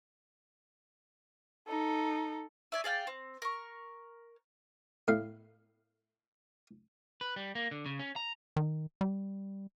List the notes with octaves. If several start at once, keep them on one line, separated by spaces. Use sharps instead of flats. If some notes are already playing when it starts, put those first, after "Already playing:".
D#4 A4
C#5 D5 E5
G#4 D5 F5 G5
C4
A#4 C#6
A2 F5
B4
G3
A#3
D3
C#3
C#4
A#5
D#3
G3